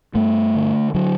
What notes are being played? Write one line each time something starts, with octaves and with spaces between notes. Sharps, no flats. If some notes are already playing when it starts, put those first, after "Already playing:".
G2 A3
D3
D3 F#3